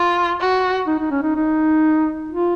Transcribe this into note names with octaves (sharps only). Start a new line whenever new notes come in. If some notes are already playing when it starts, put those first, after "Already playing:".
Already playing: F4
F#4
D#4
D#4
C#4
D#4
D#4
F4